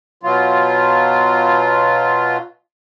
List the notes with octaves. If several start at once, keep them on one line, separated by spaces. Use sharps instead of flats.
B2 F#3 F4